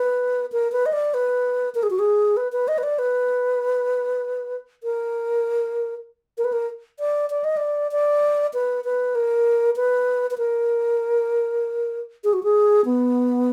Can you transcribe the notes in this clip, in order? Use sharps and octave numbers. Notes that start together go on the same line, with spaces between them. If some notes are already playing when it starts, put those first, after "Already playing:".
Already playing: B4
A#4
B4
D#5
D5
B4
A#4
G#4
F#4
G#4
B4
B4
D#5
B4
D5
B4
A#4
A#4
B4
A#4
D5
D5
D#5
D5
D5
B4
B4
A#4
B4
B4
A#4
G#4
F#4
G#4
B3